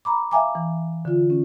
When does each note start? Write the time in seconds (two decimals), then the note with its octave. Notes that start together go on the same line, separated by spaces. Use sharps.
0.05 A#5 B5 D6
0.31 E5 F5 G5 G#5 A#5 D6
0.55 E3
1.05 D3 F4
1.30 C#4